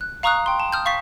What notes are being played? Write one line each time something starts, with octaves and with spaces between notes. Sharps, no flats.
F#6
F5 A#5 C#6 D#6 F6 F#6
G5 C6
A5
D#6 F6 G6
F5 C#6 A6 B6